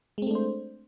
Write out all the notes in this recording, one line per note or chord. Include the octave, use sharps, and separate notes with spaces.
G#3 A3 C4 D4 C5